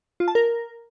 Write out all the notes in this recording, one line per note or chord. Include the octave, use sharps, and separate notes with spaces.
F4
A5
A#4